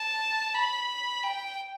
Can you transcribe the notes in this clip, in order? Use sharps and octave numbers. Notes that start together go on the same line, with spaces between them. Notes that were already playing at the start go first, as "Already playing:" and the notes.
Already playing: A5
B5
G5